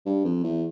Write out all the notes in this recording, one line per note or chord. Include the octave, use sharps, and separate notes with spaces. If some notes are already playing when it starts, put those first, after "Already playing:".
G2
F2
E2